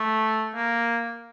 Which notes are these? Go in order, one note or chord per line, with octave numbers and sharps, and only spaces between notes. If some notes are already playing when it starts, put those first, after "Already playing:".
Already playing: A3
A#3